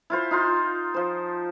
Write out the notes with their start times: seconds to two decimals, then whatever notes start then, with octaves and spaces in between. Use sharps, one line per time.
0.10 E4 F4 C5
0.31 D#4 F4 C6
0.94 F3 C5